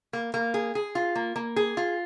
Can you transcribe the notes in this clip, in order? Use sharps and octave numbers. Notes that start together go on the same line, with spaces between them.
A#3
A#3
G#4
G#4
F4
A#3
A#3
G#4
F4